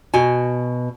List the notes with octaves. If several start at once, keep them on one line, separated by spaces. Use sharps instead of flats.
B2 F#4 G#5